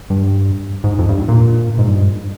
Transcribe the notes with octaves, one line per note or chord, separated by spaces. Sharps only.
G2
G#2
F2
G2
G#2
A#2
G#2
G2